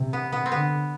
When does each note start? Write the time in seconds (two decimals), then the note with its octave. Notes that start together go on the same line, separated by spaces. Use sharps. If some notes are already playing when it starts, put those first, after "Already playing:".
Already playing: C3
0.13 B3
0.32 B3
0.46 C4
0.52 D3 B3